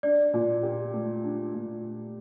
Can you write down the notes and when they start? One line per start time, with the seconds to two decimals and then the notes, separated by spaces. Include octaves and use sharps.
0.03 D4 D5
0.34 A#2
0.63 G4
0.94 A3
1.24 D4
1.54 A#2